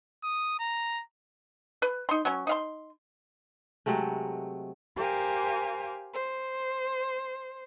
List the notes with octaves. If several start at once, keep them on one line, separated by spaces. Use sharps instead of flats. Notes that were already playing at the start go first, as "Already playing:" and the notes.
D#6
A#5
B4
D#4 C6
F#3 C#4
D#4 F5 C6
C3 F#3 G#3 A3
G4 A#4 C5 F5 G#5
C5